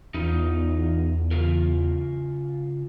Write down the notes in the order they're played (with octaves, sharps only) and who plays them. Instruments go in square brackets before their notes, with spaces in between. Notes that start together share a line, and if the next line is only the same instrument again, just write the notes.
[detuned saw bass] E2 [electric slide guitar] D#4 F4
[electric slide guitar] C#3 F4 A#4